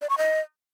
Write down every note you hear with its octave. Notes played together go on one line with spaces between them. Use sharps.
D5
C#6
D#5